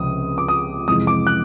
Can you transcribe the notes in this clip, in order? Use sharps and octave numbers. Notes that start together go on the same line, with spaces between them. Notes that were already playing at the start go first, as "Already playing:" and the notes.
Already playing: C#2 C3 F3 C#4 D#6
D6
D#6
F2 C3 E3 G#3 D#6
D6
F#6